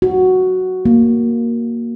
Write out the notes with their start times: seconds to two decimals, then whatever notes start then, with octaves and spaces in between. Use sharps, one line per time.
0.02 F#4
0.85 A#3